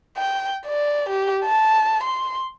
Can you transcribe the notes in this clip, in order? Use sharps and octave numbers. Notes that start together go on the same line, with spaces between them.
G5
D5
G4
A5
C6